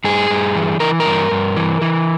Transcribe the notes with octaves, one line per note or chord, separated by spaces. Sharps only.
G2 G#4
G2
E3
E3 A#4
A#4
G2
G2
E3
E3